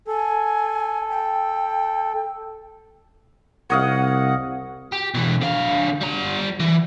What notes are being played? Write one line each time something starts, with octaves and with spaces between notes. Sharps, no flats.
A4 G#5
G5
C2 C#5 D#5 F5 F#5
G4
B2 E3
D3 F5
G3 A#5
E3